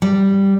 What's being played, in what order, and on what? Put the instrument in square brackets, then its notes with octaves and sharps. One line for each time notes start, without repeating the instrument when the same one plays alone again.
[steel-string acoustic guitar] G3